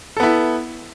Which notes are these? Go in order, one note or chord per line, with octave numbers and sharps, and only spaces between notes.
B3 E4 A4